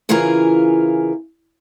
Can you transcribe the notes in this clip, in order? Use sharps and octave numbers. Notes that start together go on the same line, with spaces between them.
C#3 E3 E4 F4 G#4 A#4